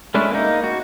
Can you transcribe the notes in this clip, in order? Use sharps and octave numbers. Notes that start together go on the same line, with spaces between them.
G#3 A3 C#4 D4 E4
A#3 D#4
F#4